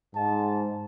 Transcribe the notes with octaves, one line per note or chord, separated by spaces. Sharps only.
G#2 A5